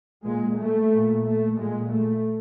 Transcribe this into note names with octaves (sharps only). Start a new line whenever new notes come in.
A#2 G#3
A3
A#2
A3
A#2 G#3
A3